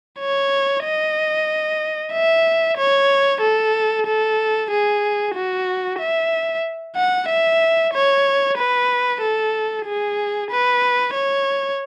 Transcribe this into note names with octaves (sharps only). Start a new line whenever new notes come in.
C#5
D#5
E5
C#5
A4
A4
G#4
F#4
E5
F#5
E5
C#5
B4
A4
G#4
B4
C#5